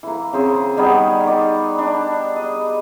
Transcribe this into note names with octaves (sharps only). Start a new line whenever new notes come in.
E3 A#3
C#3 C4 G#4
D#3 G3 B3 G#4
D#3 D5
D4
D#5